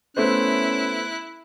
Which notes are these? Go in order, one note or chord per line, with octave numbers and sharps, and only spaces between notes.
A3 B3 C#4 E4 C5 F#6